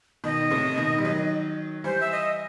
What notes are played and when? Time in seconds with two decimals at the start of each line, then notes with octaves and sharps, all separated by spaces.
0.24 B2 D#3 D#5
0.50 A2 C3
0.77 B2 D#3
0.98 G3
1.05 D#3 F#3
1.84 E3 G3 C5
2.00 E5
2.12 D#5